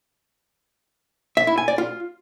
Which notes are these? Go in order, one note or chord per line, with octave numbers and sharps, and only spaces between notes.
E5
E4
G#5
D5
F4